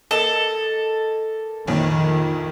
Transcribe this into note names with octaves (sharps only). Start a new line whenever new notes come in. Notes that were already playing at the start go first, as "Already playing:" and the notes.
A#3 A4 D#5
A#1 F2 A#2 D#3